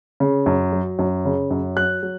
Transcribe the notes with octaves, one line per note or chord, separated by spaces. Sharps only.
C#3
F#2
F#3
F#2
C#3
F#2
F#3 F#6
F#3